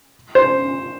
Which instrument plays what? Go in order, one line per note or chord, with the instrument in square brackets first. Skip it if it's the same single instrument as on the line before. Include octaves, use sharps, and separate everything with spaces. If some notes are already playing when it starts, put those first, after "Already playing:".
[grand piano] C5